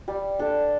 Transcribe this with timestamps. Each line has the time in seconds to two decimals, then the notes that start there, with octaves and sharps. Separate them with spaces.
0.08 G3
0.39 D4 A4